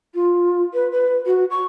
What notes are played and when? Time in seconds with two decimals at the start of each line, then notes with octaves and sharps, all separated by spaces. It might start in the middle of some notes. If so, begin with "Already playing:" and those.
0.14 F4
0.73 B4
0.92 B4
1.26 F#4
1.50 C#6